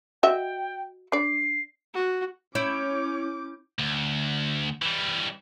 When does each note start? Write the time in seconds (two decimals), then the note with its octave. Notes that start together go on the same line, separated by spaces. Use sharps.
0.23 F#4 D#5 E5 G5
1.12 D4 D5 C7
1.94 F#4
2.55 C#4 E4 C#5 D6 G6 D7
3.79 D2
4.82 E3 G3